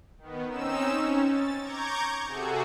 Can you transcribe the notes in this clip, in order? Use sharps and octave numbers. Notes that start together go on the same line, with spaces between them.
D#3 B3
C4 C#4 D#4 E6 E7
C#4
A6
A#5 C#6 D6 G6 G#6
C3 F#4 G#4 A4